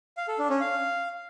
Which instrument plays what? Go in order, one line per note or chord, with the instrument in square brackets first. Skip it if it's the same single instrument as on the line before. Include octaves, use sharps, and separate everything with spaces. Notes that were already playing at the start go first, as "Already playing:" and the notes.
[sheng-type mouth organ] F5
A4
D4
C#4
F5